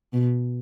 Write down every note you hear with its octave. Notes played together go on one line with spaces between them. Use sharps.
B2